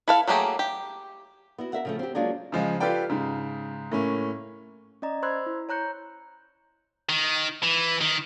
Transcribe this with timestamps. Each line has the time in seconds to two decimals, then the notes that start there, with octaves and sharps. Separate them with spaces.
0.08 E4 A4 F5
0.28 F#3 A3 A#3 G4 G#4
0.59 G4
1.58 B3 E4 F#4
1.73 A#4 E5 F#5
1.85 C#3 F3 A3
1.99 C4 G4
2.15 F#3 G#3 A#3 D4 D#4 F4
2.52 C#3 F3 G#3
2.80 F4 G4 A4 B4 D5 G5
3.10 G#2 C#3
3.92 A2 A#3 C#4
5.02 C#4 D5 D#5 A#5
5.23 C5 B5 C6 E6 F#6 G#6
5.46 E4
5.69 C#5 A#5 F#6 G6 C#7
7.09 D#3
7.63 E3
8.01 D#3